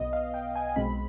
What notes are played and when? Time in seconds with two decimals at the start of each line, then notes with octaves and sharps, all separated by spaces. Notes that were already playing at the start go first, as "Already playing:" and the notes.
Already playing: B1 B2 B3 D#5
0.13 F5
0.34 G5
0.56 G#5
0.76 B1 B2 G#3 C4 B5